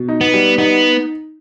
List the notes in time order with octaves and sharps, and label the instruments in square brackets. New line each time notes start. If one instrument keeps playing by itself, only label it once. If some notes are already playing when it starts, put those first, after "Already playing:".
Already playing: [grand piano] B2
D#4
[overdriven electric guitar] B3
[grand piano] G3
[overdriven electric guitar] B3 [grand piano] D#4